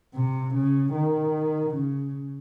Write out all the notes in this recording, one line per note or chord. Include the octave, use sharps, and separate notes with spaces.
C3
C#3
D#3
C#3